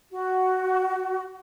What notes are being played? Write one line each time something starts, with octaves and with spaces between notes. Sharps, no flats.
F#4